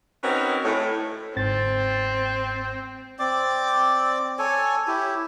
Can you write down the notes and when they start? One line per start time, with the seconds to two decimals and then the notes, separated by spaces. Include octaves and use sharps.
0.23 C4 C#4 D#4 F#4 A#4 B4
0.65 A2
1.36 G1 G#2 C4 A6
3.19 C4 D5 D6
4.39 A4 C#5 G#5
4.87 E4 G4